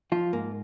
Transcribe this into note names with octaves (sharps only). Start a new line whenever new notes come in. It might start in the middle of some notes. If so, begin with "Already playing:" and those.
F3 F4
G#2 A#3